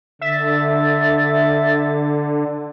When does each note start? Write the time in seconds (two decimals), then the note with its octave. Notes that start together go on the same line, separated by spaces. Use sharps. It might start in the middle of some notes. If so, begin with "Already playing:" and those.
0.21 D3 E5 A6